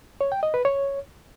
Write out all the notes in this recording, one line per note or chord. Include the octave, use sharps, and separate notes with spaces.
C#5
G5
D#5
B4
C#5